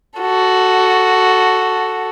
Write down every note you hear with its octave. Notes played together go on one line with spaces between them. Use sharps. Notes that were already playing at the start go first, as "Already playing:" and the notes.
F#4 A4